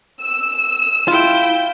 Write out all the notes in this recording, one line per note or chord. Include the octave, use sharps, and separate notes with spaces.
E6
E4 F4 G5